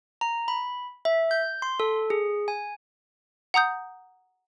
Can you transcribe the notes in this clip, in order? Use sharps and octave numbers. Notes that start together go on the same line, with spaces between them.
A#5
B5
E5
G6
C6
A4
G#4
G#5
F#5 A#5 D#6 G6